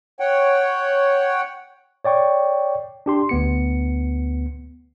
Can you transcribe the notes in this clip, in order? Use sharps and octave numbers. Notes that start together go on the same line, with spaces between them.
C#5 F#5 G5
C#5 D5 G5 C#6
D4 G4 C6
D2 B3 C#7